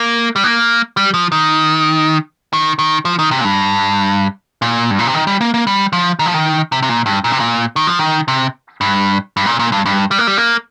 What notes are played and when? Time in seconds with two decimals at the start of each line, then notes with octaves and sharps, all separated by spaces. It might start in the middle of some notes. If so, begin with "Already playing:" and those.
Already playing: A#3
0.36 G3
0.44 A#3
0.97 G3
1.14 F3
1.32 D#3
2.53 D#3
2.79 D#3
3.05 F3
3.19 D#3
3.31 C3
3.41 A#2
3.45 G2
4.62 A#2
4.91 G2
4.99 A#2
5.07 C3
5.14 D#3
5.27 G3
5.41 A#3
5.54 A#3
5.67 G3
5.93 F3
6.19 D#3
6.26 F3
6.34 D#3
6.72 C3
6.83 C3
6.89 A#2
7.06 G2
7.24 A#2
7.31 C3
7.40 A#2
7.76 D#3
7.87 F3
7.99 D#3
8.28 C3
8.81 G2
9.37 G2
9.46 A#2
9.59 A#2
9.72 G2
9.86 G2
10.11 G3
10.19 A#3
10.27 G3
10.38 A#3